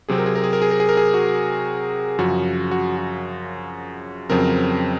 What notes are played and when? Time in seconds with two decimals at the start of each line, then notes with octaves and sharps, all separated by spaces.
0.09 C3 F#3 C4 G#4
0.18 A#4
0.26 G#4
0.35 A#4
0.44 G#4
0.53 A#4
0.62 G#4
0.71 A#4
0.80 G#4
0.89 A#4
0.97 G#4
1.14 F#4
2.19 F#2 C#3 F3 F#4
2.71 F#4
2.98 F#4
4.29 F2 C#3 F#3 C4 A#4